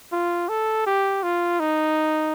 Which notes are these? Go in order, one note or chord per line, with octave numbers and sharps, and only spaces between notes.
F4
A4
G4
F4
D#4